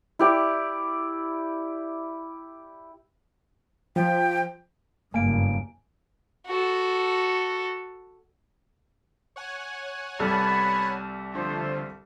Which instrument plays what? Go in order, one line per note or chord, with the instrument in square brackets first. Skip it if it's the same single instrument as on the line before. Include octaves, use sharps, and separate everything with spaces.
[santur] E4 G4 D5
[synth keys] F3 [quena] G5
[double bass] F#1 G2 [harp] A#3 [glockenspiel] G#5 D7
[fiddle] F#4 A4
[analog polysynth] C#5 F#5 G#5
[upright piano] C2 G3 A4 [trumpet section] B3 A5 B5
[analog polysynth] D3 F3 [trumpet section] A3 C5